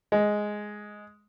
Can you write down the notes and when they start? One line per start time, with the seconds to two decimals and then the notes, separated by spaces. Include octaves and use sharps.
0.12 G#3